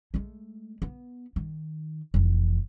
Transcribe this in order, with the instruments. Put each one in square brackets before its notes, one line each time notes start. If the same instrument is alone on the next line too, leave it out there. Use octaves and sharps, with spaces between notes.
[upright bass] G#3 A3
B3
D#3
F1 E3